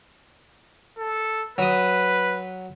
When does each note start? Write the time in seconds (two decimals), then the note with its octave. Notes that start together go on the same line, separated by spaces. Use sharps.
0.98 A4
1.58 F#3 B4 D#6